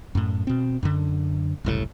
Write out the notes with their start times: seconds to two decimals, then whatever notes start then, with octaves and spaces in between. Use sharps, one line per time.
0.15 F#2 A2
0.47 B2 C4
0.83 F#2 D3
1.65 F#1 C2 A2